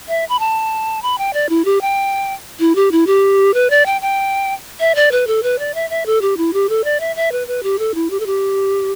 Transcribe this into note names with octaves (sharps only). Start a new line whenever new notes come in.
E5
B5
A5
B5
G5
D5
E4
G4
G5
E4
G4
E4
G4
B4
D5
G5
G5
E5
D5
B4
A4
B4
D5
E5
E5
A4
G4
E4
G4
A4
D5
E5
E5
B4
B4
G4
A4
E4
G4
A4
G4